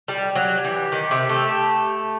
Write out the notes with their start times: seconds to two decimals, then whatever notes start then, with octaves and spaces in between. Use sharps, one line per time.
0.08 G3
0.36 F#3 G4
0.65 E3
0.92 D#3
1.11 C3
1.29 A3